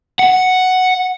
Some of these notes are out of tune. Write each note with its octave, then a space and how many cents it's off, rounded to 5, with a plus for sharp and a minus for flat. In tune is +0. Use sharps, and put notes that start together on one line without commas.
F#5 +0